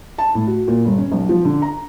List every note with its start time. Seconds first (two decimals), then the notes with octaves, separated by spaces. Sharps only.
0.18 A5
0.35 A2
0.47 F#4
0.68 A#2
0.85 G1
0.98 C#4
1.12 B1
1.29 F3
1.45 D3
1.62 A#5